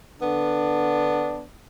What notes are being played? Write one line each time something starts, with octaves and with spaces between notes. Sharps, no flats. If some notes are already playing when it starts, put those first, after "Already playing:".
D3 B3 D4